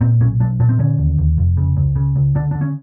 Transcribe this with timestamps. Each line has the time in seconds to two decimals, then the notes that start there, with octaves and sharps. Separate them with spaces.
0.01 A#2 C4
0.21 B1 C#4
0.40 B1 D4
0.59 A#2 D4
0.69 C4
0.79 D3 C#4
0.99 D#2
1.18 D#2
1.38 F1
1.57 C#3
1.77 C#2
1.96 C#3
2.16 C#2
2.35 D3 D4
2.51 D3 D4
2.61 C#4